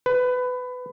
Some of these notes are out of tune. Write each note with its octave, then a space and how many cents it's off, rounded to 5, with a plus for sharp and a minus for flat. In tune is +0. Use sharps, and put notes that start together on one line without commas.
B4 +20